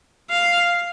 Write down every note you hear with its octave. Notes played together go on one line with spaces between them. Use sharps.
F5